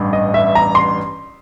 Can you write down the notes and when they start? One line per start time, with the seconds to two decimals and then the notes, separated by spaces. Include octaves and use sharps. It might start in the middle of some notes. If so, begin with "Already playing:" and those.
Already playing: A1 G2
0.13 D#5
0.34 E5
0.55 A#5
0.75 C6